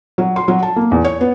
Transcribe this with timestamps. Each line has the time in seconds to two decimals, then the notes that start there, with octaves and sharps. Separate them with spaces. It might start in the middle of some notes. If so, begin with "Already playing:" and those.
0.18 F#3
0.36 C6
0.48 F#3
0.63 A5
0.76 A#3
0.92 E2
1.04 C#5
1.21 B3